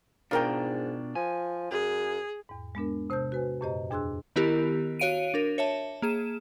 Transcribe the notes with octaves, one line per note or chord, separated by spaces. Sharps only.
G#2 B2 D4 F4 A#4 G5
F3 G#5
F#2 G#4
E2 G#2
G#3 B3 D4 A#4
C3 C5 A5 E6 G6
F#4 B4 G#5
F#2 A#2 G4 C5 D#5 A#5
E2 D4 G#4 C6 E6 F#6
D#3 B3 E4 G4 A#4
F#4 C#5 F5 D7 D#7
D4 A#4
C#5 E5 A5
A#3 G#4 E7